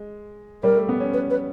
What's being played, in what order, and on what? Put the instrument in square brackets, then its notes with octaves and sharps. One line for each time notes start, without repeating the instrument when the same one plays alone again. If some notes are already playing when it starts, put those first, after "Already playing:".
Already playing: [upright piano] G#3
[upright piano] G3 [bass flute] A#4
[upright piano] A3
B3
C#4
[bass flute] B4
B4